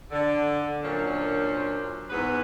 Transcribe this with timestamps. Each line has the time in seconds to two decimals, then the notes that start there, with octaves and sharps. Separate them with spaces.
0.11 D3
0.83 F#2 A#2 C#4 D4 C5
2.10 E2 G#2 B3 B4